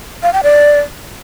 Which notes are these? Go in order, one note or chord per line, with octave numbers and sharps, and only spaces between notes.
F5
G5
D5